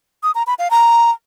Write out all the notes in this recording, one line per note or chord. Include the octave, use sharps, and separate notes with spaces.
D#6
A#5
B5
F5
A#5